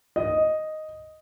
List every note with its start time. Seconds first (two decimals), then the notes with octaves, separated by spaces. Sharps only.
0.16 D#5